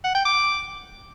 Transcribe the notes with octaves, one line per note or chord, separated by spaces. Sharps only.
F#5
G5
D6